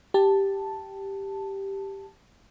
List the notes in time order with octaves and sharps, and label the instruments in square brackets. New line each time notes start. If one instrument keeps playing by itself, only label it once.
[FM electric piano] G4 A5